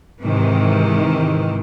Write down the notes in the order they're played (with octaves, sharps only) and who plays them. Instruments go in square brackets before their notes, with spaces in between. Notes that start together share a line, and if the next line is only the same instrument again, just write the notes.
[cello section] G#2 C3 D#3 E3